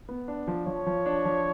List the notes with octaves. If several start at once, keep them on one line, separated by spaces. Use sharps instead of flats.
B3
D4
F3
F3 C#5
F3
D4
F3